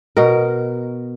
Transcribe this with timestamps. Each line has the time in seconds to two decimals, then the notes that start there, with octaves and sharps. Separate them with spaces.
0.17 B2 A#4